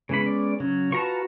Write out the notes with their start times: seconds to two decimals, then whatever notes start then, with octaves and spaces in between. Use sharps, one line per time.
0.09 C#3 E3 G#3 B3 C#4 B5
0.26 D5
0.60 C#3 F#3 C#4
0.92 F4 F#4 B4 A5 A#5 C#6